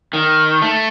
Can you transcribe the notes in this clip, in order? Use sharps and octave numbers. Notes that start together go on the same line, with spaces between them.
D#3
A3